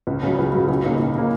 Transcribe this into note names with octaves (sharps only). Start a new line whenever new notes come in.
C#2
C#3 F#3
C#2
C#3 F#3
C#2
C#3 A#3 D#4
C#2
C#3 A#3 D#4